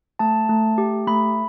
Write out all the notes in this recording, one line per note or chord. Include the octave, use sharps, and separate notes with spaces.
A3 A5
A3
G4
A3 B5